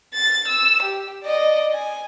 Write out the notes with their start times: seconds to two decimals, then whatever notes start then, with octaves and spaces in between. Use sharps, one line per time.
0.14 A6
0.48 E6
0.82 G4
1.24 D5 D#5
1.73 G#5